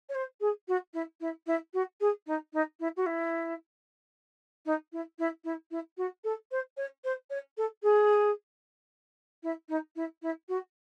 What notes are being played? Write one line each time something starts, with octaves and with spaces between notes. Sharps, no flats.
C#5
C5
G#4
F#4
E4
E4
E4
F#4
G#4
D#4
D#4
E4
F#4
E4
D#4
E4
E4
E4
E4
F#4
A4
C5
C#5
C5
C#5
A4
G#4
E4
D#4
E4
E4
F#4